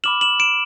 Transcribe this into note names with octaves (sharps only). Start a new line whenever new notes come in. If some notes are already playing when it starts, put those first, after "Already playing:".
B5 D6 F6 E7 F#7
E7 F#7
D7 E7